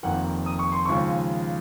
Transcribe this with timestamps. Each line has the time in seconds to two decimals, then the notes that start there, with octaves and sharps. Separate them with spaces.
0.03 F1 F2 D#3 A#3 F#5
0.46 D#6
0.59 C#6
0.72 C6
0.86 D#2 C#3 F3 G#3 C#6